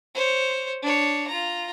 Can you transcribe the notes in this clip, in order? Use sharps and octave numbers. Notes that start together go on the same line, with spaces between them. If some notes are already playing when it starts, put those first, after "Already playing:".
C5 C#5
D4 C#5
F4 A#5